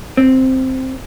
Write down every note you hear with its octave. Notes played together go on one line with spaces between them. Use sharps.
C4